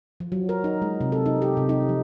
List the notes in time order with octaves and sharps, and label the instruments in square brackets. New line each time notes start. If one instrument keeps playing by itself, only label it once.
[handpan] F3
F#3
A#4
D#4
G#3
C3
A4
D#4
G4
C3
D#4
F3